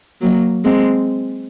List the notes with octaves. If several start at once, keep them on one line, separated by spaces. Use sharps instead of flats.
F#3 A#3
G#3 C4